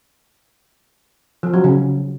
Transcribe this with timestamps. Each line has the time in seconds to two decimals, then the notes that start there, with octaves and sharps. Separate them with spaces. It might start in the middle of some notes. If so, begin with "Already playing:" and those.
1.43 F3
1.54 F#3
1.64 C#3